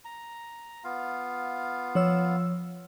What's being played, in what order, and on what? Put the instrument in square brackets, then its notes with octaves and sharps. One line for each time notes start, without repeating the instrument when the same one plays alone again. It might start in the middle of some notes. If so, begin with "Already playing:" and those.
[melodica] A#5
B3 F4 F5
[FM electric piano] F3 C#5 E6